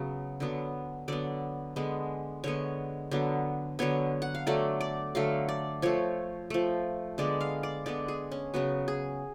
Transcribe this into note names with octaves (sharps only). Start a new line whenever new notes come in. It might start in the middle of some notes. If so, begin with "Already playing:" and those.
Already playing: C#3 F#3 B3
D3 F#3 B3
D3 F#3 B3 D5
D3 G#3 B3
D3 G#3 B3 C#5
D3 F#3 B3
D3 F#3 B3 C#5
F#5
F5
D3 F#3 A3 D5
D5
D3 F#3 A3 F5
D5
F3 A3 C#5
F3 A3
D3 G#3 B3 D5
F5
D5
D3 G#3 B3 D5
G#4
C#4
C#3 F#3 B3 F#4
G#4